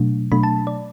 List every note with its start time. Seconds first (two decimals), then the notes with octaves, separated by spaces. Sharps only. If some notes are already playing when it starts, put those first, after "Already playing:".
Already playing: B2 F#3 A3 D4
0.32 B2 F#3 A3 D4 B5
0.43 A5
0.67 D5